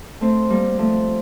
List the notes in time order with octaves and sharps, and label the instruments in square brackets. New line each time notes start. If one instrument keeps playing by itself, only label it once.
[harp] A3 C4
G3 A#3
F3 A3